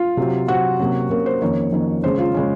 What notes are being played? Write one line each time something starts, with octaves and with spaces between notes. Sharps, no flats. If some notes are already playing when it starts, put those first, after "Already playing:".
Already playing: F4
C3 F#3 C4
C3 F#3 C4 F#4
C3 F#3 A#3 C#4
C3 F#3 A#3 C#4 A#4
C5
F2 D#3 A#3 C#4 C#5
F2 D#3 A#3 C#4
C#3 G#3 C#4 C5
F4
C#3 G#3 C#4